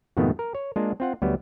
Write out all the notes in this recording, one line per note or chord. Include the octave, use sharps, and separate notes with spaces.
F2 G#2 B2 D#3 A3 B3
A#4
C#5
G#3 A#3 D4 F4
C4 F4 F#5
D2 F#3 G3 B3